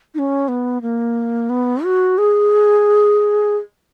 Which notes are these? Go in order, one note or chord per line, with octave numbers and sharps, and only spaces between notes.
D#4
C#4
B3
A#3
B3
F#4
G#4